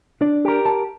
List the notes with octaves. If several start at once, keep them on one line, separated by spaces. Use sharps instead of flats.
D4 D5
G4 A#4
A5